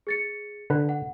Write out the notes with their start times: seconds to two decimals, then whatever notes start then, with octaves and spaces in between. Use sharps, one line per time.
0.07 G#4 A6 C#7
0.70 D3 B4
0.89 F#5